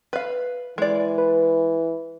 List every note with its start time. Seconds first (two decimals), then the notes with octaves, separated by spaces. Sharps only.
0.13 B4 F5
0.78 E3 G#3 D5
1.18 B4